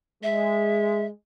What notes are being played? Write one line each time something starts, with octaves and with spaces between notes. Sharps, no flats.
G#3 E5